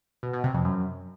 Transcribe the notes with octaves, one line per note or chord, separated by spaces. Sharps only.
B2
B2
C3
F2
F#2